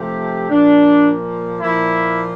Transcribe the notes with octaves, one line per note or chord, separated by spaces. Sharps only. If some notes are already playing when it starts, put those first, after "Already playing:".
Already playing: C3 F3 A3 G4
A#2 F3 A#3 D4
A#2 F3 A#3 E4